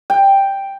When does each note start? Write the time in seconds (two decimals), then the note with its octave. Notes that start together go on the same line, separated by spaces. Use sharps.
0.10 G5